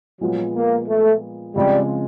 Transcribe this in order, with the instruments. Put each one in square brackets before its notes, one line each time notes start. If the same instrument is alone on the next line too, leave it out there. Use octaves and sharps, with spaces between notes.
[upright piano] A#2 F3 G#3 B3 [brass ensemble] F#3
[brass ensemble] A#3
A3
[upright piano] C#3 F3 G#3 C4 [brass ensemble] G3